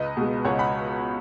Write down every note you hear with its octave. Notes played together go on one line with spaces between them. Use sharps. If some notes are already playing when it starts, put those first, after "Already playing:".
Already playing: C#2 B4 D#5
B2 G#3
C#2 C#5 F#5
F#5 B5